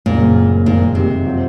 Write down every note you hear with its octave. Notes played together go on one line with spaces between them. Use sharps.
F#1 F#2 A#2 C#3 G#3 C4
F2 A#2 D#3 G#3
C3
F#3 C4 F4